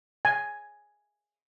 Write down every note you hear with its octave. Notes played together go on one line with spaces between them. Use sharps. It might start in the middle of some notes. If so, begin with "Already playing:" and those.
G#5